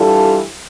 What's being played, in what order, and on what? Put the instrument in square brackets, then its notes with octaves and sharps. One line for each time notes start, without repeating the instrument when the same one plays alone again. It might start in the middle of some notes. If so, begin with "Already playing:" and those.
Already playing: [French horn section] E3 G3 D4 F4 A4